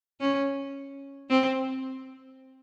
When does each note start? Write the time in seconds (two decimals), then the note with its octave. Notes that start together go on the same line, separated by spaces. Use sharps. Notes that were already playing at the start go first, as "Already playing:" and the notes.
0.20 C#4
1.30 C4